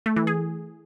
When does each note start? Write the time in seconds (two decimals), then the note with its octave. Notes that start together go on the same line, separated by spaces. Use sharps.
0.06 A3
0.16 E3
0.27 G#4